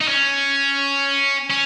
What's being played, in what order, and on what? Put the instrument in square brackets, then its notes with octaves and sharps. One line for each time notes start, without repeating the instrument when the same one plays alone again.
[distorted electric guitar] D#4
C#4
C#4